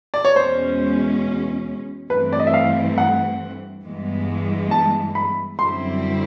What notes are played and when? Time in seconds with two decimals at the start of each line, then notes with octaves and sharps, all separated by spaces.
0.14 D5
0.25 C#5
0.36 E2 B2 G#3 C#4 C5
2.10 G2 E3 A3 C4 B4
2.33 D5
2.40 D#5
2.47 E5
2.54 F5
2.98 F#5
3.84 G2 E3 G#3 B3
4.71 A5
5.15 B5
5.59 F#2 D3 G3 C4 E4 C6